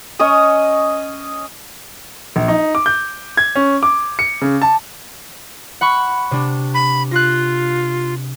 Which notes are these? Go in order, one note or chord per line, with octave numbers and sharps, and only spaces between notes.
C#4 D#5 C#6 D#6
A#1
D#4
D6
G6
G#6
C#4
D6
C#7
C#3
A5
F#5 B5 C#6
C3 D4
B5
F4 F#6 A#6